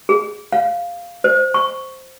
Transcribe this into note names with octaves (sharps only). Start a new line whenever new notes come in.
G#4
F5
C5
C#6